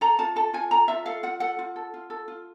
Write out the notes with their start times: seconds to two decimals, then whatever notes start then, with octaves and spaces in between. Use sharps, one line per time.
0.01 A4 A#5
0.19 F4 A5
0.36 A4 A5
0.54 F4 G#5
0.71 A4 A#5
0.88 F4 E5
1.06 A4 F5
1.23 F4 F#5
1.40 A4 F#5
1.59 F4
1.76 A4
1.94 F4
2.10 A4
2.28 F4